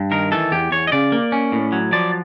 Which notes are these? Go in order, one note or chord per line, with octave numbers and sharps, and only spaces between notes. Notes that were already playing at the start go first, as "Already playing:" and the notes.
Already playing: G2
D#3 A#4
E3 A4
E2 G4
E2 C#5
D#5
C#3 D5
A#3
C#4
A2
F#3
F3 D5